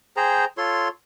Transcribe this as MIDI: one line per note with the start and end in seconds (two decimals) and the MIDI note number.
0.17 0.45 68
0.17 0.45 72
0.17 0.45 79
0.17 0.45 82
0.58 0.88 65
0.58 0.88 69
0.58 0.88 73
0.58 0.88 84